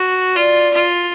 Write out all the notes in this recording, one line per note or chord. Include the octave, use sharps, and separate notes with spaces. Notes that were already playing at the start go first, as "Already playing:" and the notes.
Already playing: F#4
F4 D5
F4